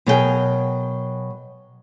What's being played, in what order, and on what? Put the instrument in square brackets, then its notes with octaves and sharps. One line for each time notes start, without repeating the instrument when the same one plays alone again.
[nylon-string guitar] B2 F#3 G#4 A#4 C5 G5